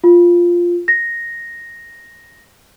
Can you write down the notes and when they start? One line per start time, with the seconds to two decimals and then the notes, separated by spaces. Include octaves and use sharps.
0.04 F4
0.88 A#6